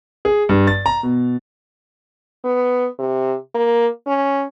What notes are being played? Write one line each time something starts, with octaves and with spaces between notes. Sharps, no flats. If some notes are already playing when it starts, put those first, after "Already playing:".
G#4
G2
A6
A#5
B2
B3
C3
A#3
C#4